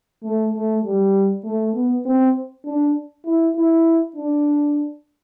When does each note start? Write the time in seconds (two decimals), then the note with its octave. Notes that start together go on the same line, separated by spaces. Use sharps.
0.23 A3
0.54 A3
0.83 G3
1.44 A3
1.74 B3
2.05 C4
2.65 D4
3.25 E4
3.55 E4
4.16 D4